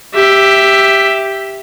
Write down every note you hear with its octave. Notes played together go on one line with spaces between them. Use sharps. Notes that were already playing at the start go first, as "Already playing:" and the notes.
G4 E5